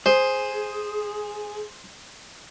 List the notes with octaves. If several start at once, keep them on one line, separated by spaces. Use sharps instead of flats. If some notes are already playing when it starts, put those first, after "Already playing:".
G#4 C5